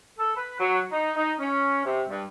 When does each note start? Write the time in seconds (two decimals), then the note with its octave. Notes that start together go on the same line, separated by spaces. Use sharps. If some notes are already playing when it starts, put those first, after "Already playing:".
0.19 A4
0.36 B4
0.60 F#3
0.91 D#4
1.16 D#4
1.39 C#4
1.85 C3
2.09 G2